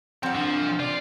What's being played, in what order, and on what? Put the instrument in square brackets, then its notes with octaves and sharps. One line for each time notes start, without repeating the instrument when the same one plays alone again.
[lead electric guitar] F3 G5 [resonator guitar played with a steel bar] C4 F#5
[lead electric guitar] C3 D4 [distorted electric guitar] F3
[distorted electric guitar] F4 [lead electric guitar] D5